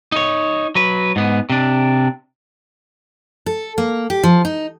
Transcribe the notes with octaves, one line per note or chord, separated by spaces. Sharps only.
D#4 C#5
F#3 B4
G#2 B3
C3 D4
A4
A#3
G4
F3
D#4